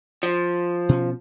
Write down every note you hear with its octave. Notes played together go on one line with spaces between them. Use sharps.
F3
B2 C#4